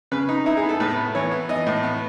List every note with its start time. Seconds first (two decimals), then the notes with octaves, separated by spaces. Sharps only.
0.12 C#3 B4
0.29 D#4
0.46 D#4 E4
0.57 G#4
0.63 B3
0.69 A4
0.80 A2 B4
0.97 B3
1.15 E3 C#5
1.31 B3
1.49 E3 D#5
1.66 A2
1.83 B3